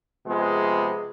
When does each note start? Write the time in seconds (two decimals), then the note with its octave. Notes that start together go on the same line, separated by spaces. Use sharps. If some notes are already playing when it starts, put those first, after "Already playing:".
0.25 C3 F3 G#3 B3 G#4